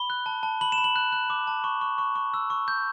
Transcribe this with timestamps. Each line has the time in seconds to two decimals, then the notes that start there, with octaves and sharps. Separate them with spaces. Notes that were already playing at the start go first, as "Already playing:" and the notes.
Already playing: B5 G7
0.10 F#6
0.26 A5
0.43 A5
0.61 B5 F#7
0.72 E7
0.78 B5
0.84 F#7
0.96 F#6
1.12 F#6
1.30 D6
1.47 A5
1.64 C#6
1.81 C#6
1.98 C#6
2.16 C#6
2.34 E6
2.50 C#6
2.68 G6